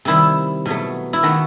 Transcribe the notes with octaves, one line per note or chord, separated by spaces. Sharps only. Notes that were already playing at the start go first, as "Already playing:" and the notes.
C3 D#3 G3 E4
B2 F#3 A3
E4
D#3 A3 F#4